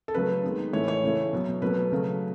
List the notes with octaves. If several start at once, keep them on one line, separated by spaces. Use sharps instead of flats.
A4
C#3 F#3 A3 B4
D#3 G#3 B3
A2 E3 A3 C#5
C#5
C#3 E3 A3
B2 F#3 B3
B2 F#3 A3 B4
C#3 F#3 A3